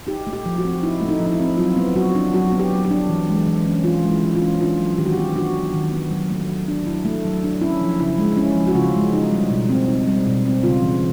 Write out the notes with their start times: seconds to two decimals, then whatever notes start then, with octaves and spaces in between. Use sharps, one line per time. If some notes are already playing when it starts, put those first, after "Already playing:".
0.07 D#4 G4
0.27 A3
0.33 G4
0.46 F3
0.58 F#4
0.64 C4
0.83 D#4 E4
1.01 A3
1.09 D#4
1.20 F3
1.26 D#4
1.33 E4
1.40 C4
1.58 F#3 F4
1.77 B3
1.96 F#3 F#4
2.15 D4
2.34 F#3 F#4
2.52 B3
2.59 G4
2.72 F#3
2.85 G4
2.91 D4
3.10 E3
3.29 G#3
3.47 E3
3.66 C#4
3.84 E3 F4
4.04 G#3
4.09 E4
4.23 E3
4.35 F4
4.42 C#4
4.61 D4 F4
4.79 F#3
4.98 D#3 G4
5.06 F#4
5.13 B3 G4
5.36 D4 F#4
5.55 F#3
5.74 D#3
5.92 B3
6.11 F#3
6.30 A3
6.49 F#3
6.68 D4
6.87 F#3 E4
7.05 A3
7.25 F#3
7.44 D4
7.61 C#4 E4
7.81 F3
7.99 C#3 E4
8.18 G#3
8.37 C#4 E4
8.56 F3
8.67 F#4
8.75 C#3 F4
8.94 G#3
9.13 D#4
9.32 G3
9.50 B2
9.69 C4
9.88 D#4
10.07 G3
10.26 B2
10.46 C4
10.63 C#3 F4
10.82 E3